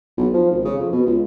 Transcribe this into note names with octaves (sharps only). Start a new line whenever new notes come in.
B1
F3
G#1
C#3
F2
B2
C#2